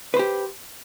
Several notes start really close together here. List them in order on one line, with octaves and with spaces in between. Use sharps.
B4 C5 G4